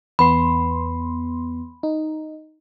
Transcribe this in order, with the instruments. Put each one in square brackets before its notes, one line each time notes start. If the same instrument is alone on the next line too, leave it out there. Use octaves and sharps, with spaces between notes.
[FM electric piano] E2 B3 C6 [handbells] B5
[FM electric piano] D#4